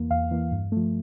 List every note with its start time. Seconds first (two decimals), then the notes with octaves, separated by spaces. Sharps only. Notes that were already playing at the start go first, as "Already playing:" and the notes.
Already playing: E2 E3 A#3
0.11 E2 F5
0.31 E3 A#3
0.51 G2
0.72 F3 A3